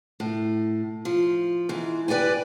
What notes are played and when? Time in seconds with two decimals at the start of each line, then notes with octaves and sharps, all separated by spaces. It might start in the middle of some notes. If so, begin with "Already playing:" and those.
0.20 A2
1.05 F3
1.69 G#2 E3
2.08 G4 B4 D5 G5 G#5